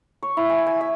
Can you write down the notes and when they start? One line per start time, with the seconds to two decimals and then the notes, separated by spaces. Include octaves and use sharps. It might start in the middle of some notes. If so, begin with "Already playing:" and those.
0.23 C#5
0.37 E4
0.50 G#5
0.66 G#5
0.81 E5